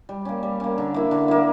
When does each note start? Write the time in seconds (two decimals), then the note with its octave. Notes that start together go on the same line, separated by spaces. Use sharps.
0.09 G3
0.25 A#3 C#4
0.43 G3
0.60 A#3 C#4
0.78 D3
0.94 A#3 E4
1.11 D3
1.28 A#3 E4